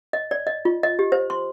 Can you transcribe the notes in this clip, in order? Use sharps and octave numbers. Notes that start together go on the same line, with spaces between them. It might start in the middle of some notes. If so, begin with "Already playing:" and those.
D#5
D5
D#5
F4
D#5
G4
C5
C6